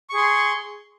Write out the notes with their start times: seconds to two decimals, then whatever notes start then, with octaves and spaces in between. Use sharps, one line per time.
0.10 C#6
0.13 G#4
0.17 C6